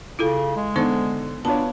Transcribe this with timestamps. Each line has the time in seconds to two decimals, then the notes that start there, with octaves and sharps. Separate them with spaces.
0.19 C#3 E4 F4 A4
0.56 G#3
0.76 D3 B3 D#4 C5
1.45 B3 D4 F4 C#5 A5